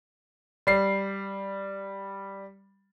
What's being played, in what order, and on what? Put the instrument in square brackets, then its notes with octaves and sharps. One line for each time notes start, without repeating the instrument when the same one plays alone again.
[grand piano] G3 C7